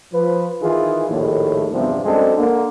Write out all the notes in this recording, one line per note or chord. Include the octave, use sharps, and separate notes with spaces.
F3 B4
D#3 E3 F4 G#4
A#1 D#2 A2
E2 G2 C3 E3 F3 B3
F#2 G#3 C4 D4 G#4 A4
D3 A#3